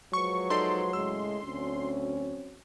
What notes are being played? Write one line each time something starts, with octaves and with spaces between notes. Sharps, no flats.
F3 F#3 G#3 B4 C#6
D#4 A4 D5 C6
A2 C#3 G#3 E6
D2 F#3 C4 C#4